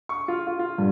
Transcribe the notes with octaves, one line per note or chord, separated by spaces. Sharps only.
C#6
F4
F4
F4
G2